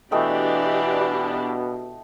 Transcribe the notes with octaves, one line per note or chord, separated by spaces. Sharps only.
B2 E3 A3 D4 G4 D5 D#5 G5